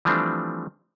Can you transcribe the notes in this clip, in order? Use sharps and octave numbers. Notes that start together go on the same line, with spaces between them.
E3 F3 G3 A3 C4 D4